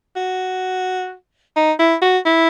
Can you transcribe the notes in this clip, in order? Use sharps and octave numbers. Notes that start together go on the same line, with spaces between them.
F#4
D#4
E4
F#4
E4